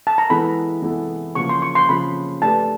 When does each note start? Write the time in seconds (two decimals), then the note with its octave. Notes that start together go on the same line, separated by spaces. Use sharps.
0.07 A5
0.18 A#5
0.30 E3 G#3 B3 E4 A4 B5
0.82 E3 G#3 B3 E4 A4
1.35 C#3 F3 A#3 C#6
1.49 C6
1.62 C#6
1.75 C6
1.89 C#3 F3 A#3 B5
2.42 A3 D4 G4 B4 A5